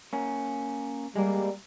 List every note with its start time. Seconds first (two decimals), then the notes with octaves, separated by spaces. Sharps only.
0.13 A#3 C#4
1.16 G3 G#3 A#3